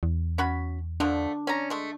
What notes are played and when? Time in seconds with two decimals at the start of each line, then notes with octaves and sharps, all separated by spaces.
0.03 E2
0.38 C#4 F#4 B5
1.00 D3 F3 A3 D4
1.47 C#4 A#5
1.70 G#3 A3